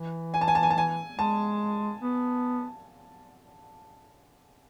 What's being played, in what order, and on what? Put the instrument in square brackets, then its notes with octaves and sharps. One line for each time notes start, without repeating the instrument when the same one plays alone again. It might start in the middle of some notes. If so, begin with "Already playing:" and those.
Already playing: [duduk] E3
[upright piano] G#5
A5
G#5
A5
G#5
A5
G#5
[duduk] G#3 [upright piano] A5
[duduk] B3